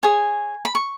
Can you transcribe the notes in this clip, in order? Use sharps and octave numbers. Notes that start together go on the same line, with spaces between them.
G#4 C#5 G#5
B5
C#6